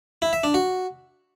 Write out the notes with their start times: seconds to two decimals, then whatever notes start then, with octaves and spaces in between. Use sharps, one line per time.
0.22 E4
0.33 E5
0.44 D4
0.54 F#4